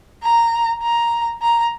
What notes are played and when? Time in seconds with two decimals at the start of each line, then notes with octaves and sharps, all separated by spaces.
0.23 A#5
0.82 A#5
1.42 A#5